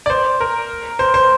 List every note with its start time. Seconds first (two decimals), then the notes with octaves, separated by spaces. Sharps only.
0.06 D5
0.10 C5
0.40 A#4
0.99 C5
1.14 C5